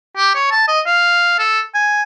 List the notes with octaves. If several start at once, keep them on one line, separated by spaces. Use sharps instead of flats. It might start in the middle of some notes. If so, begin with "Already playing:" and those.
G4
C#5
A5
D#5
F5
A4
G#5